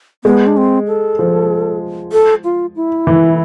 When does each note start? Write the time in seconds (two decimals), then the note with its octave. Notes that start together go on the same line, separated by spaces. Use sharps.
0.24 G#3 B3
0.47 D4
0.57 C4
0.87 A4
1.19 F3
2.12 A4
2.44 F4
2.76 E4
3.07 E3